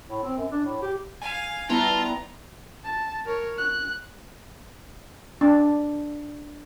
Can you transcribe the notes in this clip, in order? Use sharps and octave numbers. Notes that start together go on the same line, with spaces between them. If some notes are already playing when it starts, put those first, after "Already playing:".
A2
C4
F#2
D4
A2
G4
F5 G#5
G3 B3 E4 F4 A5 A#5
A5
A#4 C#5
F#6
D4